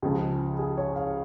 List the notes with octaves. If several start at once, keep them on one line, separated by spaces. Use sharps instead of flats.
C#2 C#3 F3 G#4
G#4
C#5
F5